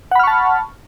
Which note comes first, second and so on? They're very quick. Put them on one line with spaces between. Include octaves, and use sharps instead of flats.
F#5 B5 F6 C#6 A5